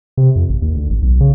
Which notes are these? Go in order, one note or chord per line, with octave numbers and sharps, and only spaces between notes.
C3
F2
G#1
D#2
D2
G#1
B1
C#3